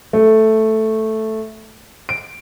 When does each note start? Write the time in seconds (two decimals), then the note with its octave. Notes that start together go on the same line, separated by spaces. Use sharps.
0.13 A3
2.09 D7